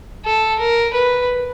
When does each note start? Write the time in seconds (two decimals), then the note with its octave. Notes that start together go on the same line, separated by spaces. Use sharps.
0.25 A4
0.59 A#4
0.94 B4